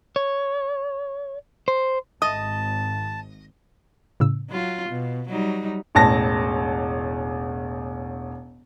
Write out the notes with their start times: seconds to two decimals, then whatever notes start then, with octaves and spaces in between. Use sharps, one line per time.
0.16 C#5
1.68 C5
2.22 G#1 D#5 A5 D#6
4.20 A2 C#3 E6
4.50 F#3 F4
4.89 B2
5.29 F#3 G3 D#4
5.95 E1 A1 A5 A#6